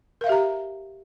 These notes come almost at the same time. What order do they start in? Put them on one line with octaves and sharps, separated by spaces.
A#4 F5 E5 G4 A#5